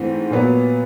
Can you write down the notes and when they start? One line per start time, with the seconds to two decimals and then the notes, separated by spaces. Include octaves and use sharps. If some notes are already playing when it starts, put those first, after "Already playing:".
Already playing: G#2 E3 A3 C4
0.30 A#2 F#3 B3